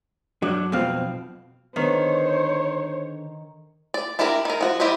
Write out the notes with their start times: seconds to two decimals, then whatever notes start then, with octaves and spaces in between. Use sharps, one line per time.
0.42 F#2 F#3 D4
0.72 B1 F2 B2 C4 F5
1.76 D3 D#3 B3 C5 C#5
3.94 D5
4.19 D4 E4 F#4 G4 A#4
4.45 D#3 A#4
4.61 F3 F#4
4.80 G3 E4 G4 C5 D#5